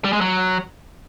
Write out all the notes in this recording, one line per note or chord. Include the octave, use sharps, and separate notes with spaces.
G3
G#3
F#3